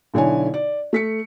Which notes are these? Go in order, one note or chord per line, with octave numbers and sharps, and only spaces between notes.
B1 D3 E4 C#5 G#5
D5
A3 B6 C#7